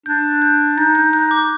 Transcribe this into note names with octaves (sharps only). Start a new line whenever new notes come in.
D4 G6
G6
D#4 G6
G6
F#6
D6